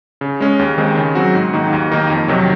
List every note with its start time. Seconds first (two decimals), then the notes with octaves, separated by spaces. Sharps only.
0.21 C#3
0.40 G#3 C#4
0.59 D#2
0.78 D#3 G#3 C4
0.97 C#3
1.15 F#3 C4 D#4 F#4
1.35 G#2
1.53 D#3 A#3 D#4 F#4
1.73 D#2
1.91 D#3 A#3 D#4 A#4
2.10 F2
2.28 C3 D#3 F#3